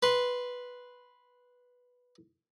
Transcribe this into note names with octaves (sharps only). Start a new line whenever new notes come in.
B4 C6